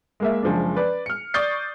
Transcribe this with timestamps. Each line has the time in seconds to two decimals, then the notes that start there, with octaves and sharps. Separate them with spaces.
0.20 G#3 A#3 E5
0.43 F#1 F3 G#3 D4
0.76 B4 D5
1.06 F6 C#7
1.34 D5 C#6 D#6 G6 A6 C7